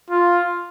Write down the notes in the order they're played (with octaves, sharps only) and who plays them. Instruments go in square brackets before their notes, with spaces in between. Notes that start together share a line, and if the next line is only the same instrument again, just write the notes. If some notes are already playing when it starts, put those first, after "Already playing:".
[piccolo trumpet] F4